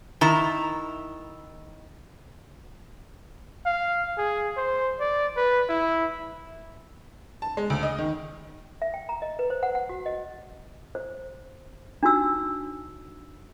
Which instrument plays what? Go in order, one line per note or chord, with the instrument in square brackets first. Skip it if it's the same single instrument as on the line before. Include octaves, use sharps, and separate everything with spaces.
[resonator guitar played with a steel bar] D#3 E4 A#5
[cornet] F5
G#4
C5
D5
B4
E4
[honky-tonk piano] A5
G#3
D2
D#5
D#3
[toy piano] E5
G5
A#5
D#5
B4
C5
F#5
F#5
F#4
D#5
C5
D4 D#4 F#4 E6